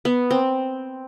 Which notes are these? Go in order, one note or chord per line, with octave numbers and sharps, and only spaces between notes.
B3
C4